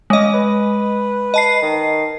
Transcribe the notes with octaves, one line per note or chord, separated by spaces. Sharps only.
G#3 C#4 D#5
B4
D#5 A5 C7
D#3